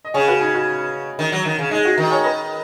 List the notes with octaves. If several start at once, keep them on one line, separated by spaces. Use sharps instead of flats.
D#5
C#3 G#4 C#5
F#4 B4
D#4 G#4
F#4
D#3
F#3
D#3
C#3
G#3 D#4
F#4
D#3
G#4 C#5
B4 D#5